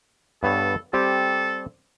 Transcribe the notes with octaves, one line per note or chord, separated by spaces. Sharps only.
G2 B3 A4 C#5
G3 C4 G4 A4